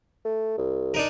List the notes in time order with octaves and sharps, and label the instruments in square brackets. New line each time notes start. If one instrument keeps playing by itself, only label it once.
[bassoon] A3
C2
[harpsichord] D4 D#4 A#4